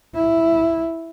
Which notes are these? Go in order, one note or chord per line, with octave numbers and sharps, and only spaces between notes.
E4